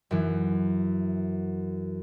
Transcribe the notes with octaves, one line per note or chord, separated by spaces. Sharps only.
F#2 E3